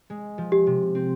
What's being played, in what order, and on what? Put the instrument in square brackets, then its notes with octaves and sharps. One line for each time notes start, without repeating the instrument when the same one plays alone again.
[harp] G#3
F3
[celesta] G4
[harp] C3
C4